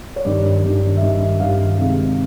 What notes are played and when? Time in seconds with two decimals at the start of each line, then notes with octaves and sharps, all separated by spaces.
0.16 C#5
0.25 G2 D#3 G3 D5
0.63 G2 D#3 G3
0.97 E5
1.01 G2 D#3 G3 D#5
1.40 G2 D#3 G3 F5
1.78 C3 D#3 G#3 F5